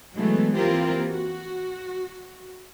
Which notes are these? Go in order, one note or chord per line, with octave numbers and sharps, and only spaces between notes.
E3 F#3 G#3 A3 B3
E3 A#3 C4 F4 G4 A#4
F#4